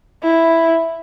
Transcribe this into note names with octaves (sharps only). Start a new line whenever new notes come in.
E4